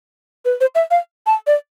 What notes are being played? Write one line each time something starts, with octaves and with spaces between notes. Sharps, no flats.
B4
C5
E5
F5
A5
D5